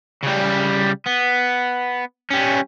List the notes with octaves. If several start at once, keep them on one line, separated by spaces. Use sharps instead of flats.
C#3 G3
B3
G3 C#4